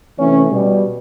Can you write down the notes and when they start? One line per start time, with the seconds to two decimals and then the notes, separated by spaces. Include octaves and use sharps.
0.18 C3 E3 A3 C#4
0.50 B2 G3